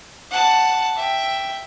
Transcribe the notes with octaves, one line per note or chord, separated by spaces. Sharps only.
F#5 A5
E5 G5